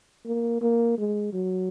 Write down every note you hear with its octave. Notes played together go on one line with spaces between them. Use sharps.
A#3
A#3
G#3
F#3